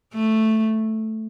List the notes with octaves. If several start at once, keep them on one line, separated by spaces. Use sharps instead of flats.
A3